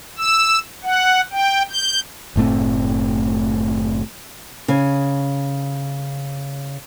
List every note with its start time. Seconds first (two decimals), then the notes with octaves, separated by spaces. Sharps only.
0.18 E6
0.84 F#5
1.32 G5
1.70 G6
2.36 F#1 A2 A3 C4
4.68 C#3 G#5